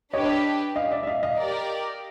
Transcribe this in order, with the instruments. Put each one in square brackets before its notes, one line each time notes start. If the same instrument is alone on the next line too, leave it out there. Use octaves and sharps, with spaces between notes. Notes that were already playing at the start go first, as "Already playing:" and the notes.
[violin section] D4 G4 B4 [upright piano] C#5 D#5
[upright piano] D#5 F5
D5 E5
E5
D#5 F5
D#5 F5
[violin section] G4 A#4 D5